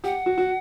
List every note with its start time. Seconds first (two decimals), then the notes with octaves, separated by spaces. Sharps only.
0.04 G4 F#5
0.26 F#4
0.38 F#4